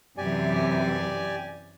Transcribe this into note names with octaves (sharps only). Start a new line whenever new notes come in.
F#2 C3 E3 G4 D5 G#5